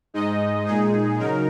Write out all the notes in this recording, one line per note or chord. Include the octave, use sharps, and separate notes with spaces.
G#2 G#3 D#4 D#5
A#2 G#3 D#4 G#4
C#3 F#3 D#4 A#4